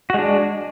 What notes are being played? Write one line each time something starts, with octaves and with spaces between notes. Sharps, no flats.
G#3 D4 F#4